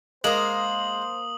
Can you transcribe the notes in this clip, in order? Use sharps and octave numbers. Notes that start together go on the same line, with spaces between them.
G#3 A#3 C5 A#5 D#6 F#7